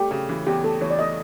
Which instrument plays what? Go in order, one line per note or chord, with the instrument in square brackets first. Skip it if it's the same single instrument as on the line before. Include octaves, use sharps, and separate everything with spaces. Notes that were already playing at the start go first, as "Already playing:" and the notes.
Already playing: [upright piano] A3 [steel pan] G4
[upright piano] C#3
E3
[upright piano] E2 [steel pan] G4
[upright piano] A3 [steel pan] A4
[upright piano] E3 [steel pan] C#5
[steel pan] D5
[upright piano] A3 [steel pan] D#5